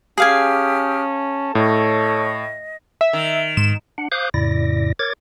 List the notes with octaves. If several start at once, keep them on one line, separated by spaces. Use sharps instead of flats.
C#4 G4 G#4 F5 G#5 A5 D#6 F6
A2 A4 C#5 D#5
E5
D#3
G#2 E7
D4 F#5
C5 F5 D6 D#6 F#6 G6
F2 A2 C#3 E4 D5 A#6
A#4 C#5 D6 G#6 A6